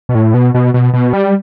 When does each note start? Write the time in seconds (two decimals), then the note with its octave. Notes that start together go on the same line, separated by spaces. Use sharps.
0.09 B2
0.15 A2
0.34 B2
0.54 B2
0.74 B2
0.94 B2
1.13 G3